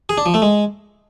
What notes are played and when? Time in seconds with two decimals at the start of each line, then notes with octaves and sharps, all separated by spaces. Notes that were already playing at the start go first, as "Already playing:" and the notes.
0.09 G#4
0.18 D4
0.26 F3
0.34 A3
0.42 G#3